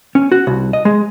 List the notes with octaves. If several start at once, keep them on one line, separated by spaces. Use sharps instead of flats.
C#4
F#4
C2
D#5
G#3